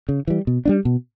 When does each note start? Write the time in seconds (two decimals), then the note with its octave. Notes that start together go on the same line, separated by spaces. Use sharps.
0.09 C#3
0.27 E3 G3
0.47 B2
0.65 G3 B3 D4
0.85 B2